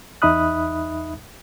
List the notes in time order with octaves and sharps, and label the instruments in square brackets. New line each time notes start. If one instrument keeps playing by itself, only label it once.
[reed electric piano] E2 D#4 E5 B5 D#6 F#6